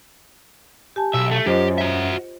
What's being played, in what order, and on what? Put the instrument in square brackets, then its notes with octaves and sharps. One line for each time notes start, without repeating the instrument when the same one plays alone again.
[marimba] G4 G#5 A5
[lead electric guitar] B1 [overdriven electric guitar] E5
[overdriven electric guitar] A3
[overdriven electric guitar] F#2 [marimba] F4 C5 D#5 [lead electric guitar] G4
[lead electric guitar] F#4 E5